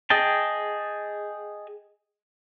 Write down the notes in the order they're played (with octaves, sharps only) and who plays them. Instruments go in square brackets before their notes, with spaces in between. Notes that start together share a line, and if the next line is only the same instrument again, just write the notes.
[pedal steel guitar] G#4 D#5 G5 A5